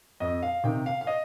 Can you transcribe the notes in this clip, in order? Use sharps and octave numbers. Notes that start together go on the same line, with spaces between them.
F2 D#5
F5
C3 D#3 G5
F5
F5
D#5